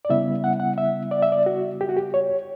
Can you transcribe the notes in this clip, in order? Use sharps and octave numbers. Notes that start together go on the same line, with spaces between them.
D5
C#3 G3 B3 E4 E5
F#5
F#5
E5
D5
E5
D5
F#4
G4
F#4
G4
C#5